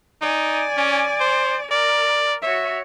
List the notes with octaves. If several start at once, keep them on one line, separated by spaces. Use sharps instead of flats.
D#4 D5 G#5
C#4
C5
A#4 D5
F#4 C#5 E5